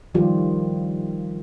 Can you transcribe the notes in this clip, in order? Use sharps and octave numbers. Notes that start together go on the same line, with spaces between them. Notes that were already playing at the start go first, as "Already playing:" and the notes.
D#3 F3 G3 F4 G4